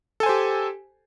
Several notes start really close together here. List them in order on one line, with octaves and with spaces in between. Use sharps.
A4 G#5 C5 G4